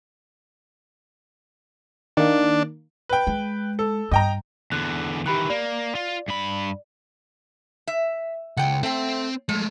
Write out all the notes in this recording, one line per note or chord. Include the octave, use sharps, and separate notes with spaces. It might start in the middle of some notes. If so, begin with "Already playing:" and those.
D#3 A#3 D4
B4 G5
G#3
A4
G2 D#5 G5 A#5
E2 D3 F#6
D#3 E3 G4 B5 F#6
A#3 D5
F4
G2 B5
E5
C#2 F#5 G5
A3 C4 G5
F3 G#3 A3